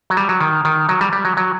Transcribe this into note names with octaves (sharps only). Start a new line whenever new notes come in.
F#3
G3
F#3
D#3
D#3
F#3
G3
G3
F#3
F#3